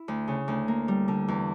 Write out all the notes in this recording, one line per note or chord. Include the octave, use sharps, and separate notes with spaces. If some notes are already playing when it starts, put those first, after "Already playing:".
Already playing: E4
D2
C#3
D2
A#3
G3
D3
E2